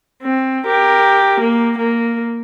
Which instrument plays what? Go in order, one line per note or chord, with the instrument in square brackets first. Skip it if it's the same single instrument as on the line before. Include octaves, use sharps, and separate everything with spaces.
[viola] C4
G4 A#4
A#3
A#3